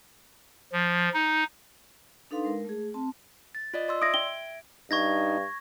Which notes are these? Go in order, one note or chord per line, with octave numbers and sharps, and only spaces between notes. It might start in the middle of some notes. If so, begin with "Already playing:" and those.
F3
D#4
D4 D#4 A4 B4 F5 C6
G#3 A#4
A3 G#4
C4 A5
A6
F4 D5 D#5
D5 C6 E6
E5 D#6 G#6 A#6 D7
G5 G7
G2 D#4 C#6 G#6 A#6